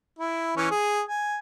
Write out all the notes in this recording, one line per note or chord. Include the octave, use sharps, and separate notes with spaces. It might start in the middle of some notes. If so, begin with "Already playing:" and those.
E4
E3 C#4
G#4
G#5